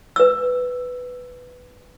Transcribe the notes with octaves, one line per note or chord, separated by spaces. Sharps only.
B4 E6